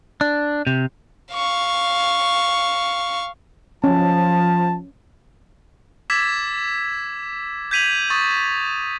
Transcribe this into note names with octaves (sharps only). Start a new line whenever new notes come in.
D4
C3
F5 C#6
F3 C#4 A5
D6 E6 G#6 A6 B6 E7
G6 G#6 B6 D#7 F7 F#7
C#6 D#6 A6